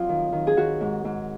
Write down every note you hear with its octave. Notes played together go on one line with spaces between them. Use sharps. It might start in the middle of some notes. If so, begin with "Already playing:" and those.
Already playing: F2 F#3 F4
D#3
D#3
G#4
D#3 F#4
G#2
G#2